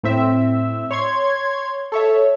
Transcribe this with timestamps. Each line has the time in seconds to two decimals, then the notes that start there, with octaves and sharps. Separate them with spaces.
0.03 A2 C4 E5
0.91 C#5 C6 G#6
1.92 A4 C#5 E5